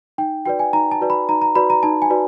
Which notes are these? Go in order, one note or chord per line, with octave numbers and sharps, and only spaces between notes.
D#4 G5
F#4 B4 D5 G5
G#5
D#4 A#5
A5
F#4 B4 D5
B5
D#4 A#5
A#5
F#4 B4 D5 B5
A#5
D#4 A5
G#5
F#4 B4 D5